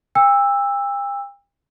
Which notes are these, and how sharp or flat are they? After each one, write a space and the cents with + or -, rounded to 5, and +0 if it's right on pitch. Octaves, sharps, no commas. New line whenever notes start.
G5 +40 E6 +0